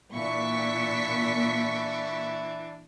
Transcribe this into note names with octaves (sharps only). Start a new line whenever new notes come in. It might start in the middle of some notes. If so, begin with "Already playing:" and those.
A#2 E3 D4 E4 C#6 B6